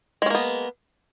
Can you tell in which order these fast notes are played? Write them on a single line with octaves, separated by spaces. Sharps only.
G#3 C#4 A#3 B3